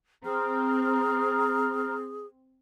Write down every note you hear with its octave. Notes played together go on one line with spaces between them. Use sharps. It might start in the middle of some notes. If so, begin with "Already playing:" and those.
C4 G#4 A#5 F6